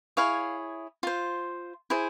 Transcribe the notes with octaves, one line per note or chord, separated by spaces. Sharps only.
E4 G#4 C#5 F5
F4 C5
E4 G#4 C5